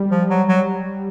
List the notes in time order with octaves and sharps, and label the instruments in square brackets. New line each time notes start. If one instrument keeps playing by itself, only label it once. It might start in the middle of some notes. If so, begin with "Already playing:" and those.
Already playing: [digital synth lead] G3
[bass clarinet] F3
F#3
F#3